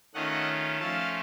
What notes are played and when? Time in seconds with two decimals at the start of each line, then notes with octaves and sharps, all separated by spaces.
0.14 D#3 A3 C#4 F4 D#5 F#5
0.79 F3 A3 C#4 F4 F5 A5